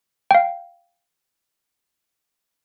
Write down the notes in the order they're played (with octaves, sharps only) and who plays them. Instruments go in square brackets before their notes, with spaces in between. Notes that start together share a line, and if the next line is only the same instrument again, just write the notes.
[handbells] F5 G5